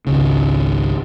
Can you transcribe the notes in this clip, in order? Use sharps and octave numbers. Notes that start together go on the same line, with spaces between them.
G#1 C#2 C#3